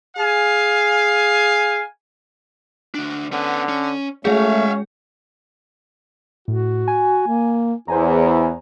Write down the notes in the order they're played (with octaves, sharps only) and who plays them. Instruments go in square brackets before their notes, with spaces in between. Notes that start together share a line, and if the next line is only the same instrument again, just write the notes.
[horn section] G#4 F5 G#5
[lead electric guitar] D2 D4
[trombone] D3 [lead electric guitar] B3 C#4
[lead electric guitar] C#4
[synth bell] G#3 G#4 [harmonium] A3 [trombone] C#4 [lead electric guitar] E5 F5
[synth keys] A2 [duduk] F#4
[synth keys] G#5
[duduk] A#3
[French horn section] E2 [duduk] E4 [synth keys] C5 G#5 A#5